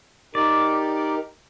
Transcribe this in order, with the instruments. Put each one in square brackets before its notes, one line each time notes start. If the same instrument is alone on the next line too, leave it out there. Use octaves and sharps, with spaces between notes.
[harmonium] D#4 G4 A#4 [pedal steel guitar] D5